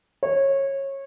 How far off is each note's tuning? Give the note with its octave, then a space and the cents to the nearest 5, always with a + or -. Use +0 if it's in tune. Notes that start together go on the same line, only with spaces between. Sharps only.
C#5 -20